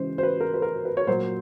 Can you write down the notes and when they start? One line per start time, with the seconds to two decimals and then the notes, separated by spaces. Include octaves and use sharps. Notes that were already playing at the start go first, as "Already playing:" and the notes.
Already playing: C#3 E3 G#3 C#4 C5
0.18 C5
0.23 B4
0.40 A#4
0.54 B4
0.62 A#4
0.85 B4
0.97 C#5
1.07 A#2 F#3 A#3 C5